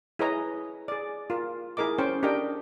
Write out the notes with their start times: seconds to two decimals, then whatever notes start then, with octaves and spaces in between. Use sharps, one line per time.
0.19 E4 G#4 B4 C#5 D#5 A#5
0.88 G#4 D5
1.30 F4 A#4
1.77 E4 G#4 A#4 D#5 D6
1.98 C#4 C5 G5 C#6
2.23 D4 G4 A#4 D#5 G5